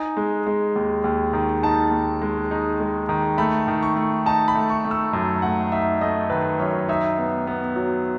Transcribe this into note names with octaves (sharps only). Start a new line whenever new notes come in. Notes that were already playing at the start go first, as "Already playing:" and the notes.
Already playing: D#4 G#5
G#3
G#3
D#2
D#2
D#3
D#4 A5
D#2
G#3
D#4
G#3
D#3
A3 B5
D#3
C#6
A3
D#4 A5
B5
A3
C#6
A3
E6
F#2
A3 F#5
D#4 E5
A3 D#5
D#3 B4
F#2 C#5
D#4 E5
B3
B3
F#3